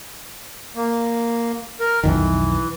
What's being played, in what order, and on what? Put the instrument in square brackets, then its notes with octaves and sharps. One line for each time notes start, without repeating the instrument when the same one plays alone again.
[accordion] A#3
A#4
[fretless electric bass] B1 F2 D#3 [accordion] E3